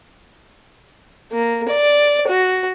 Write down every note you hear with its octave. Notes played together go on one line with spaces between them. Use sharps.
A#3
D5
F#4